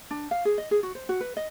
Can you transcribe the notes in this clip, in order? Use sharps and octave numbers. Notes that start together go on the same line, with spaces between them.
D4
F5
G#4
D#5
G#4
F#4
C5
F#4
B4
D#5